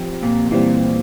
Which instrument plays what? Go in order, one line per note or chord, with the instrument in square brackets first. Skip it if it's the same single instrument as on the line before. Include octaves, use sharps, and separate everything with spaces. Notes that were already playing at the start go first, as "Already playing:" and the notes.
Already playing: [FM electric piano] F3 C4 G4
[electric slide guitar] A#2
[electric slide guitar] A#2 [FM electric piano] E3 G3 C4